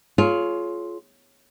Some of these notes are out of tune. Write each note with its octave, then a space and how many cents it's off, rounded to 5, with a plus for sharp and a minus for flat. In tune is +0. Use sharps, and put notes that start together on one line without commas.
F4 +0 G#4 +40 C#5 +10